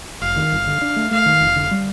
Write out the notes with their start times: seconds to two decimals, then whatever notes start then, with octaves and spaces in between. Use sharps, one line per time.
0.21 F1 F5
0.36 D#3
0.52 G1
0.67 D3
0.82 D4
0.96 A3
1.11 A3 F5
1.26 D#3
1.40 F1
1.56 D3
1.71 G3